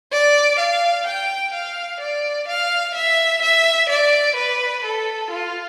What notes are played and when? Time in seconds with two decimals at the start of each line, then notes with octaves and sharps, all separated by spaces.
0.12 D5
0.59 F5
1.07 G5
1.54 F5
2.01 D5
2.48 F5
2.95 E5
3.42 E5
3.89 D5
4.36 B4
4.84 A4
5.31 F4